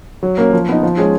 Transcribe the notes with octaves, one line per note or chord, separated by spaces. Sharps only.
F#3
A#3 C#4
F3
B3 D#4
F3
G#3 C#4 G#4